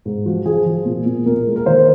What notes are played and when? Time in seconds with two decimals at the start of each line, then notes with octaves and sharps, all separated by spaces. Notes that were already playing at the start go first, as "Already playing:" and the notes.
0.05 G#2
0.26 F3 F#4
0.46 F3 G#4
0.66 F3
0.85 A#2
1.06 A#2
1.26 A#2 A#4
1.46 G#3
1.56 A#4
1.66 D#3 C5